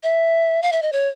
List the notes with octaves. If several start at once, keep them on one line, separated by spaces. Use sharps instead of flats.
E5
F5
E5
D#5
C#5